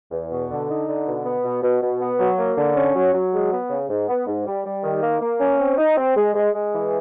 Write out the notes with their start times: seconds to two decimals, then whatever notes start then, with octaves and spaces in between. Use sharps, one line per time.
0.11 E2
0.31 B2
0.50 D3
0.69 D#4
0.87 D3
1.06 B2
1.24 B3
1.44 B2
1.62 B2
1.82 B2
2.00 B3
2.19 F#3
2.37 A#3
2.57 D3
2.75 C#4
2.95 F#3
3.13 F#3
3.33 G#3
3.52 B3
3.70 C#3
3.88 G#2
4.08 B3
4.27 G#2
4.46 G3
4.65 G3
4.83 D#3
5.02 A#3
5.21 A#3
5.40 C#4
5.59 C4
5.78 D#4
5.97 C4
6.15 G#3
6.34 G#3
6.53 G#3
6.72 E3